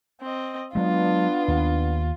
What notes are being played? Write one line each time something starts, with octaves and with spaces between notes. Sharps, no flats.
C4 D#5
F#3 G#3 B3 D4 F4
D#2